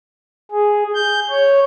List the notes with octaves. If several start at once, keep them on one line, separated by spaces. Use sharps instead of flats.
G#4
G6
C#5